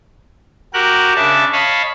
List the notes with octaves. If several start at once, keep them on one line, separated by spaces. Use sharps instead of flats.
F#4 G4 A#4 F#6
C#3 D4 E5 A5
C#5 D#5 F5 A5 B5